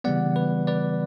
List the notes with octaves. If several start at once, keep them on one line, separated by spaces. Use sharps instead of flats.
C#3 E3 G3 B3 D5 F#5
B4
B4 D5